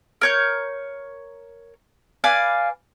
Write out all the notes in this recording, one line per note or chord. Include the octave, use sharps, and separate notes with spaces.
A#4 C#5 G6
B4 D5 F5 G#5